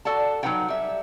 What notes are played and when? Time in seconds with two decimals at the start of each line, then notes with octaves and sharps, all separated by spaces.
0.05 F#4 A4 D5 F#5 A5
0.43 F#3 D4 D#4 B4 F#5 G5
0.68 G3 E5